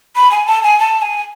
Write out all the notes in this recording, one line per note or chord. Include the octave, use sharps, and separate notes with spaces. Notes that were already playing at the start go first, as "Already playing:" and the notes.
B5
G#5
A5
G#5
A5
G#5